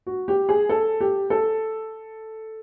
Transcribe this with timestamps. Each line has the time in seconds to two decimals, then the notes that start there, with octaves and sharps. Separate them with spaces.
0.07 F#4
0.28 G4
0.49 G#4
0.69 A4
1.00 G4
1.30 A4